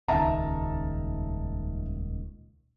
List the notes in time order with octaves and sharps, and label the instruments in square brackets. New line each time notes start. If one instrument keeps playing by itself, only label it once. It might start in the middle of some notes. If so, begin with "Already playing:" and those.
[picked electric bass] D#1 C#2 D#3 [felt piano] E5 A5 A#5